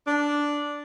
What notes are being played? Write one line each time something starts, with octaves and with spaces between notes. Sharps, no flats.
D4